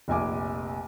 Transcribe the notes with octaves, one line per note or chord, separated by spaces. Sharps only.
F1 A#1 G#5 D6